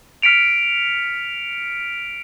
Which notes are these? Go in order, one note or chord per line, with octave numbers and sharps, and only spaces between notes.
F6 B6 C#7 D7 F7